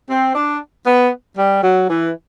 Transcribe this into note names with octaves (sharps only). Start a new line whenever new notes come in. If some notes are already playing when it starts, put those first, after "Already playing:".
C4
D4
B3
G3
F#3
E3